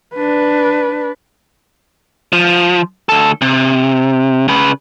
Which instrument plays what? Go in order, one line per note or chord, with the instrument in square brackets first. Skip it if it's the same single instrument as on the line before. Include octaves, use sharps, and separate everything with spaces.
[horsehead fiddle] D4 B4
[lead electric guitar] F3
D2 A4
C3
C#3 B4